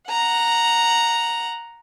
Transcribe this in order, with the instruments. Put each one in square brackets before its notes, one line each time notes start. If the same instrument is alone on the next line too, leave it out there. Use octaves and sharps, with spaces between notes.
[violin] F#5 A#5